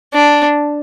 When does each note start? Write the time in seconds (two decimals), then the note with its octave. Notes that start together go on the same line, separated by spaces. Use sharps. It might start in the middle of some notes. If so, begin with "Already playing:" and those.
0.14 D4